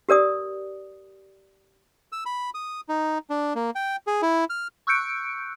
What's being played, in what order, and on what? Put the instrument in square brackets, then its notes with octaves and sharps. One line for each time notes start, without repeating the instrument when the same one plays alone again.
[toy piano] G4 A#4 D5 D#6
[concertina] E6
B5
D#6
D#4
D4
A#3
G5
G#4
E4
F6
[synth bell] C#6 E6 F#6 G6 C#7 D7